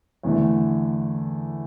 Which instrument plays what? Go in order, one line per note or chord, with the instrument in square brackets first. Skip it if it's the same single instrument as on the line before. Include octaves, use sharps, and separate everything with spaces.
[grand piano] E2 D3 A3